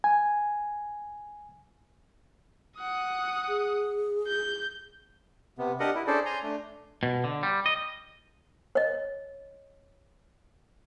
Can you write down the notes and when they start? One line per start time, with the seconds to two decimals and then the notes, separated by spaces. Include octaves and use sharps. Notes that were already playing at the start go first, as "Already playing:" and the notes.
0.04 G#5
2.77 F#5 D#6
3.48 G#4
4.27 G6
5.58 C3 B3
5.80 D4 G4 A#4 D#5 F#5
5.95 E4
6.07 C#4 D4 G#4 A4 C5 D5
6.26 G#5 A#5 C6
6.43 A3 D4
7.03 B2
7.24 D3
7.43 G3
7.66 D#5
8.75 C#5 D#5